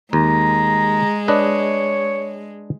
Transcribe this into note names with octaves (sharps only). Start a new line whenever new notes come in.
D#2 G#3 A#5
D4 B4 C#5 D#5